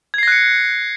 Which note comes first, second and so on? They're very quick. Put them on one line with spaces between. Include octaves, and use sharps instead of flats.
G#6 C7 A#6 F#6 C#7